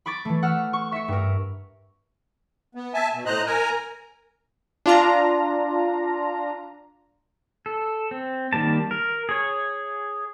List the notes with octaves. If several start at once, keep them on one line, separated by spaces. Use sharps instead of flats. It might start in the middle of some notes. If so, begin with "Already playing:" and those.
B5 C#6 D6 A6
E3 A3
F#5 E6 F6
C#6
E5 C#6 C#7
G2 A#4
B3
E5 G#5 A5
B2
A2 C5 D#5 A#5 F#6
A#4 G#5 A#5
D4 F4 A#5
A4
C4
D#3 G3 A#3 A5
A#4
G#4 C#5